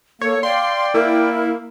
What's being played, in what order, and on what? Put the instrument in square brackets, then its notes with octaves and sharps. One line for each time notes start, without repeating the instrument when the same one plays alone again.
[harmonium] A#3 [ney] A4 [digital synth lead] C#5
[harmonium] D5 G5 [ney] F5 [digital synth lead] C6
[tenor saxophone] A#3 [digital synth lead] E4 [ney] A#4